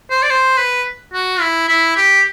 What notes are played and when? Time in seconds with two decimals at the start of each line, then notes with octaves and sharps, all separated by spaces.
0.10 C5
0.23 D5
0.30 C5
0.57 B4
1.14 F#4
1.40 E4
1.69 E4
1.96 G4